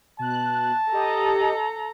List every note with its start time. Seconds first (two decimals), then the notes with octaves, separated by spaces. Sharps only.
0.19 B2 A5 F#6
0.92 G4 A4 D#5 A#5